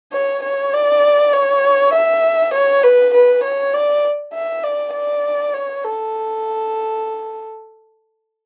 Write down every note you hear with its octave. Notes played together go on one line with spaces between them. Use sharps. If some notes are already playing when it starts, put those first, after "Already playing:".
C#5
C#5
D5
C#5
E5
C#5
B4
B4
C#5
D5
E5
D5
D5
C#5
A4